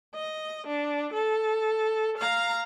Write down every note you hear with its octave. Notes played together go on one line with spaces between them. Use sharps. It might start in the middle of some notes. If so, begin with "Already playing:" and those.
D#5
D4
A4
F5 A#5